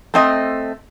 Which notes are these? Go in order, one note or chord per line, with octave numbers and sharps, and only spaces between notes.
A3 C4 D#5